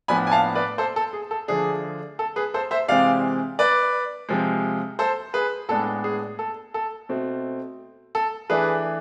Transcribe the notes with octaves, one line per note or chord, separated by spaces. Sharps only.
A2 F3 B3 D4 G#5 B5
G#5
F5 A5
B4 D5
A4 C5
A4
G#4
A4
D3 F3 A3 D4 G#4
A4
G#4 B4
A4 C5
C5 E5
C3 E3 G#3 C4 D5 F5
B4 D5
C3 F3 G#3
A4 C5
G#4 B4
A2 G#3 B3 D4 A4
G#4
A4
A4
B2 A3 C4
A4
E3 A3 D4 G#4 B4